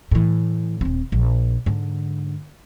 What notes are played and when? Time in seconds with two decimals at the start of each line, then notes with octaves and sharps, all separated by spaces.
0.11 A2 E3
0.81 D#1 C4
1.12 A#1
1.66 G#2 D3